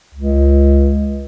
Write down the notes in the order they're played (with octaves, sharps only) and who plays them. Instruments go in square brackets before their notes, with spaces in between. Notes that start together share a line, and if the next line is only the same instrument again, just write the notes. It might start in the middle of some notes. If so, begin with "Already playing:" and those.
[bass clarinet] C#2